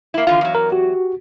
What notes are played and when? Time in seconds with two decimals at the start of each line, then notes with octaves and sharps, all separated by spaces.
0.14 A#3 E4
0.27 D3 E3 F4 F5
0.41 E2 F#3
0.55 A#4
0.72 F#4 G4